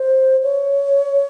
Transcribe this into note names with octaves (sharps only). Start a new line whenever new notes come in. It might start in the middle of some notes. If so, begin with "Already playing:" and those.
Already playing: C5
C#5